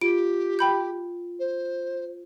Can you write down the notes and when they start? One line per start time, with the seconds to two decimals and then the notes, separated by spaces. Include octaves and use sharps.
0.01 F4 G4 D7
0.59 G5 B5 G6
1.39 C5